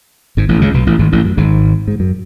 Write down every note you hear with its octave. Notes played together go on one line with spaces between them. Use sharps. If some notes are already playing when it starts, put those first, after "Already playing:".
G#1 G#2
A1 A2
C#2 C#3
B1 B2
A1 A2
G#1 G#2
A1 A2
F#2
G#1 G#2
G#2
F#2